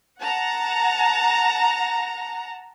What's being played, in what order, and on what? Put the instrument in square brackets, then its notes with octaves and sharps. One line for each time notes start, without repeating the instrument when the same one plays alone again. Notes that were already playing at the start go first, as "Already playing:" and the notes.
[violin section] F#5 A5 A#5